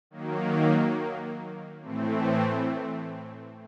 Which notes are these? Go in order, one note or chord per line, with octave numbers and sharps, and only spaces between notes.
D#3 F#3 A#3
A2 E3 A3 C4